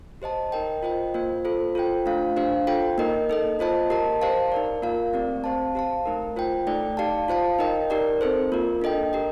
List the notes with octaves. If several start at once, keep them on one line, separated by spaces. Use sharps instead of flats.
G4 C5 D#5 A5
D#4 A#4 D#5 G5
F4 C5 D#5 G5
A#3 F4 C5
F4 A4 C5
F4 A4 C5 G5
A3 D4 F4 C5 F5
D4 G4 C5 F5
F4 A4 C5 G5
A#3 D#4 A#4 D#5
D#4 A4 D#5
A#3 F4 C5 D#5 A5
G4 A#4 D#5 A5
G4 C5 F5 A5
D#4 A#4 D5
A#3 F4 A#4 F5
A3 C4 G4 D5
C4 G4 C5 F5 A5
G4 C5 F5 A5
A3 D#4 A#4
F4 C5 G5
A3 D#4 A4 D5 G5
D#4 G4 D5 F5 A5
F4 C5 F5 A5
D#4 A#4 D#5 G5
D#4 G4 A#4 D5
C4 D#4 A4 C5
A#3 F4 A#4
D4 A4 D#5 G5
G4 A#4 D#5